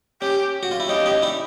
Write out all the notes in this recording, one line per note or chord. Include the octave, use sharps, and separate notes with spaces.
C#4 G4
F#4
F4
E4
C#4 D#4 G4
C#4 D#4
D4 E4